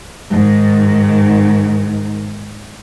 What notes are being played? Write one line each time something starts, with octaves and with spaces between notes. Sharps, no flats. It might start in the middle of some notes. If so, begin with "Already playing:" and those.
G#2 D#3